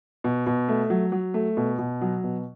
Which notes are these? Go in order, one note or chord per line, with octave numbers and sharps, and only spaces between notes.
B2
B2
A3
F#3
F#3
A3
B2
B2
F#3
B2